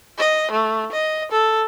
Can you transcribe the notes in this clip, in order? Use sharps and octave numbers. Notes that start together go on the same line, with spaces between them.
D#5
A3
D#5
A4